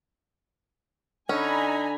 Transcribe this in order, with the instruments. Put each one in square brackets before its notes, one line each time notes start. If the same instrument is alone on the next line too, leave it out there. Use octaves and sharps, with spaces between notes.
[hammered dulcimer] D3 [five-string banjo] C#4 [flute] D#4 [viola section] G#5 A#5 B5